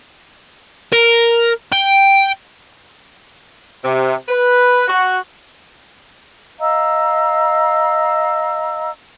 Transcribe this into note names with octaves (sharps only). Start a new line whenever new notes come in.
A#4
G5
C3
B4
F#4
D#5 F5 A#5 E6